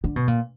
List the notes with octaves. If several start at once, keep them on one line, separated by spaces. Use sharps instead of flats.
D3
B2
A#2